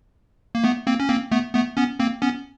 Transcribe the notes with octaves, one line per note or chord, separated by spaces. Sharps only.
A#3
A3 B3
A#3 C4
C#4
A#3 C4
A3 B3
A3 B3
B3 C#4
A#3 C4
B3 C#4